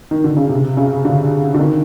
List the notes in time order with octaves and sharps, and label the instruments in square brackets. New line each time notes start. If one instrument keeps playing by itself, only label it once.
[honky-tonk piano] D#3
D3
C#3
C3
C#3
D3
D3
D#3